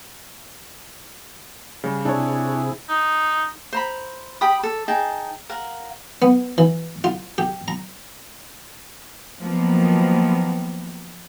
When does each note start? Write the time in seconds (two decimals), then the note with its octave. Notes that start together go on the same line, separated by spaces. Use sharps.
1.84 C#3 G3
2.05 C3 D4 E4 G#4 C#5
2.89 D#4
3.73 C5 A#5 B5
4.41 G4 G5 B5 D#6
4.63 A4
4.88 D#4 G#4 G5 A5
5.49 A#4 F5 F#5
6.22 B3
6.58 E3
7.04 F4
7.38 G4
7.68 A#5
9.41 D#3 F3 F#3 A#3 B3